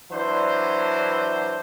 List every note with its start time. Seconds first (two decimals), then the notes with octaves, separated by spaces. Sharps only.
0.12 E3 F#3 D4 C5